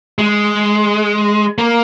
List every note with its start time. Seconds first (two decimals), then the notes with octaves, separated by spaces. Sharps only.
0.19 G#3
1.58 A#3